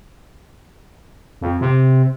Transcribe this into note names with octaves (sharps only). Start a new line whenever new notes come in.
F2
C3